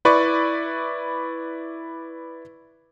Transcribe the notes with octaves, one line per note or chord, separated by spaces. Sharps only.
E4 B4 D5 C#6